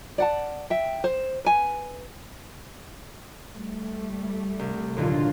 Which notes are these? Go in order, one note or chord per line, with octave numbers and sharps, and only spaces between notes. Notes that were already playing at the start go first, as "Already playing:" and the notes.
D5 F#5 A5
E5 G5
C5
B4 G#5
G3 A3
C2
D#2 A#2 D3 F#3 F4